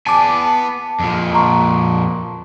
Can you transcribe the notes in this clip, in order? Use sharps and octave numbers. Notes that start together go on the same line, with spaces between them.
B3 G#5 A5 D6
F2 A#2
A#5 C6 C#6